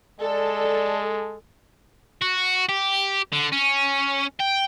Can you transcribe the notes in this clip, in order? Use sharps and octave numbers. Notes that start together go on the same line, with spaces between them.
G#3 A4 D5
F#4
G4
D3
C#4
G5